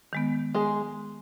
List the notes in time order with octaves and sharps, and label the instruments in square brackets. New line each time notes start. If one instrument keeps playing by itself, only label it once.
[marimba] D#3 G#3 B3
[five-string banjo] G#3 G#4